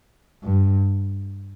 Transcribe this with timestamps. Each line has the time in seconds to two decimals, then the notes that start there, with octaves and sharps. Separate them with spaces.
0.43 G2